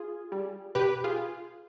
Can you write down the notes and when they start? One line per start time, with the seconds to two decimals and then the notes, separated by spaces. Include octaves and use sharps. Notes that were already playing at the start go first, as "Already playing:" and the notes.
Already playing: F4 G#4
0.32 G3
0.75 B2 G4 B4
1.04 F4 G#4